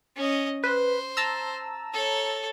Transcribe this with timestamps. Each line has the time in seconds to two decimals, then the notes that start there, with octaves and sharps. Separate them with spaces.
0.16 C#4 D#5
0.64 B4 C5
1.17 A5 A#5 E6
1.93 A4 C#5